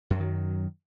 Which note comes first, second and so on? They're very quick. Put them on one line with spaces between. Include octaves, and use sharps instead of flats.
F#2 F#3 D#3